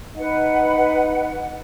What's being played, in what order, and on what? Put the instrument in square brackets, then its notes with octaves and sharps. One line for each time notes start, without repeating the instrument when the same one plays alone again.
[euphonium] D#4 [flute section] B4 F#5